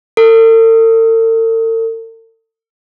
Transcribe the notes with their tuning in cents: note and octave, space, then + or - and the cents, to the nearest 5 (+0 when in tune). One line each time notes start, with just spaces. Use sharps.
A4 +45